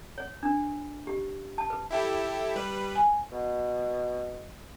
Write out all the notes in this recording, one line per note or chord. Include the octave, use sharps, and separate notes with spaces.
C#5
D4
G4
A5
B4
E4 G4 A4
G3 B4
G#5
B2